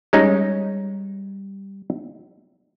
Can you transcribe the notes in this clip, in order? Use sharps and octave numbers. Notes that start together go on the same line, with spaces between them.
G3 G#3 C#4 D#4